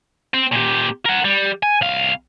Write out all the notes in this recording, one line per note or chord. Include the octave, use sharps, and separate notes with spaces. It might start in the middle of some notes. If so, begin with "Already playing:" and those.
C4
A#2 G4
A#4 F#5
G3
G#5
C2 F5